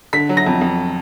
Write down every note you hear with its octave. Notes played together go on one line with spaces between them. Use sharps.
D3 B6
F#3
A#6
F2
F2